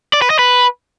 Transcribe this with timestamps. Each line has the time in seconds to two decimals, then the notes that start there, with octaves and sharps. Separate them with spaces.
0.13 D5
0.22 B4
0.30 D#5
0.39 B4